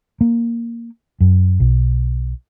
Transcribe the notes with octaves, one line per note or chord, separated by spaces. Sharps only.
A#3
F#2
B1